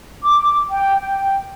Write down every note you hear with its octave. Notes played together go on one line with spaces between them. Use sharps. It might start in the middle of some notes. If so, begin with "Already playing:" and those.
D6
G5
G5